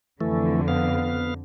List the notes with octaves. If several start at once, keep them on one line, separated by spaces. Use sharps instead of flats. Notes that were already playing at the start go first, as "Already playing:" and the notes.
F2 D3 E3 A3
B3 F5